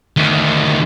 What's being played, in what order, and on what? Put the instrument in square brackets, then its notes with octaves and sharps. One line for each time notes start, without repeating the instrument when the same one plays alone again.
[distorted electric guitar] D2 D#3